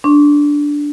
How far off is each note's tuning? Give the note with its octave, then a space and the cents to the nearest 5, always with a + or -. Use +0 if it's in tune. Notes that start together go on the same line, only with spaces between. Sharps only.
D4 -5 C6 +45